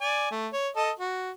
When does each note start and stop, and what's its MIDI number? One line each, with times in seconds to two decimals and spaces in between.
0.01 0.29 74
0.01 0.29 80
0.31 0.48 57
0.53 0.69 73
0.76 0.91 69
0.76 0.91 75
0.99 1.31 66